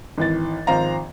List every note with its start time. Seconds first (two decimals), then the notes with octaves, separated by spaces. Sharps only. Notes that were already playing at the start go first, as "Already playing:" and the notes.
0.18 G#1 E3 A6
0.67 G#1 F3 C5 F5 A#5